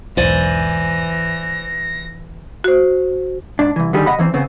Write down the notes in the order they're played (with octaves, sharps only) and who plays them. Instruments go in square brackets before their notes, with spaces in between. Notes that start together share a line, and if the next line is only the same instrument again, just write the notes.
[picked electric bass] B1 E2 G#2 [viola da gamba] E3 [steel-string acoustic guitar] C5 D5 G#5 [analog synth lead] A#6
[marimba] F#4 C5
[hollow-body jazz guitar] G#2 D4
C2 E3
D3 D#3 G3 G#4
C2 D#5 F#5 B5
E2 E3 C4
C#3 B3 C4